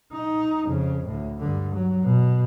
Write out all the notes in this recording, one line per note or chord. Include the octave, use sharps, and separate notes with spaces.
D#4
F2 C#3
D2 A2
G2 D3
F#3
B2